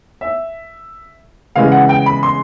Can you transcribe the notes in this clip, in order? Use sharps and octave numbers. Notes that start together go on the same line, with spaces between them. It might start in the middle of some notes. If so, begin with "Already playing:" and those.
E5
C#3 E3 G#3 F5
F#5
G5
B5
C6